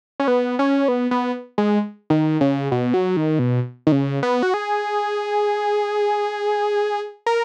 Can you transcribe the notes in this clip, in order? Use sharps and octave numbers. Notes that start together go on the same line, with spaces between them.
C#4
B3
C#4
B3
B3
G#3
D#3
C#3
B2
F#3
D#3
B2
D#3
C#3
B3
F#4
G#4
A#4